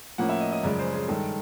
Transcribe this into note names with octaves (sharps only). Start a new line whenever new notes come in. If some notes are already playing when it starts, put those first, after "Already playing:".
A2 F3 A#3 C#4 F#5
E5
D#5
D#5
F#2 C#3 F3 G#3 D5
C5
G#4
G2 D#3 G#3 A4